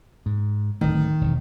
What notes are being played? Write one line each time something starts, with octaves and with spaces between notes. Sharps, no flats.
G#2
D1 D#3 A3
E1